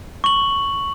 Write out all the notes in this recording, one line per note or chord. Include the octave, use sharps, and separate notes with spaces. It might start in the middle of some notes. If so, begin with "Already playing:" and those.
C#6 F#7